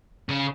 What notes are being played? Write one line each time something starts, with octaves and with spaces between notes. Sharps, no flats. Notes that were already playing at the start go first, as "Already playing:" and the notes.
C#3